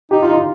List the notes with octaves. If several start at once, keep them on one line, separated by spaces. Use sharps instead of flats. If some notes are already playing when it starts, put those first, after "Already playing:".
D#4 G4
F4
D#4
F4